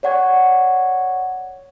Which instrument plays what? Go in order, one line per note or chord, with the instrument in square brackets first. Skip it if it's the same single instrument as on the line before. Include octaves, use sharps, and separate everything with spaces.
[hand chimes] C#5 D5 F#5 C#6 G#6